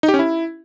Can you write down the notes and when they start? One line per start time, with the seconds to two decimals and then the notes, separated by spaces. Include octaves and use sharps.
0.03 D#4
0.08 G4
0.14 C#4
0.19 E4